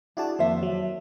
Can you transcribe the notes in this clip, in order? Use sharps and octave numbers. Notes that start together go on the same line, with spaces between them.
D4 E4 F#4 G#4 A5
F2 D#3 A#3 C5 E5
F#3